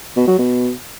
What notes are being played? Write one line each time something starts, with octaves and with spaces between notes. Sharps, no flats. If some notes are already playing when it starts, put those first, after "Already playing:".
B2
F#3
B2